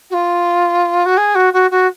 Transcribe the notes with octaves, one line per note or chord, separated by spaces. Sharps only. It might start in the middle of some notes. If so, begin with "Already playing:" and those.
F#4
F4
F#4
G#4
F#4
F#4
F#4